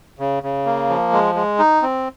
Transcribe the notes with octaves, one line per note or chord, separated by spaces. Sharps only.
C#3
C#3
A#3
F3
G#3
G#3
D#4
C4